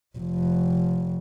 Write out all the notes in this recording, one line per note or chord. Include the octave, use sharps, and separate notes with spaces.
F1 F2